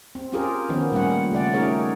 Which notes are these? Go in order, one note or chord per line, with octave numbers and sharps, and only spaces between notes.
C4
C4 C#4 F4 G4 G#4 A#4
D#3 F3 B3 C#4
A#2 G3 A3 C#4 F#5
C#3 A3 D5 F#5
A3 C#4 D#4 G#4 A#4 C#5